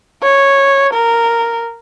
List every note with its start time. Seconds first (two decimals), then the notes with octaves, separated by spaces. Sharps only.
0.23 C#5
0.94 A#4